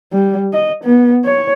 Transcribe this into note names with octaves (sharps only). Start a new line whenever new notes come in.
G3
D#5
B3
C#5